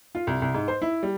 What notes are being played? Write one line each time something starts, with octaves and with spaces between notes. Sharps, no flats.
F4
C2
C2
G#2
C5
E4
G3